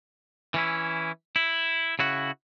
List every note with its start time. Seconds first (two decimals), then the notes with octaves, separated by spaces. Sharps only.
0.54 E3 C#4 E4
1.36 E4
1.99 C#3 E4 F#4